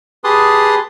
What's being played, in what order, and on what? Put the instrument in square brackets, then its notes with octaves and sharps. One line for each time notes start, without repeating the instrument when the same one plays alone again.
[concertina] G4 G#4 B4 A5 C6 D#6